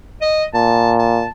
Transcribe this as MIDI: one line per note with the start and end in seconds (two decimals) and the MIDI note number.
0.21 0.44 75
0.54 1.25 46
0.54 0.92 81
0.99 1.26 81